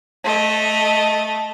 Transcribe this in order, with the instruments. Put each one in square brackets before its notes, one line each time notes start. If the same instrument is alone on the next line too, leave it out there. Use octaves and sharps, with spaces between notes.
[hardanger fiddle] A3 D#5